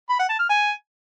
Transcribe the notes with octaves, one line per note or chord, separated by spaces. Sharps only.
B5
F#5
A5
F6
G#5